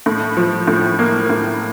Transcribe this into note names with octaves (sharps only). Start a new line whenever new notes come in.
A2
F3
A2
A#3
A2